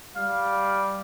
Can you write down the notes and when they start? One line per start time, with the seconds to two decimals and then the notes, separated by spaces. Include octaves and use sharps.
0.16 G3 F5